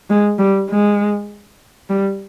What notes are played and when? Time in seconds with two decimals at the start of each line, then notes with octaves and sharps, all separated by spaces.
0.10 G#3
0.39 G3
0.69 G#3
1.90 G3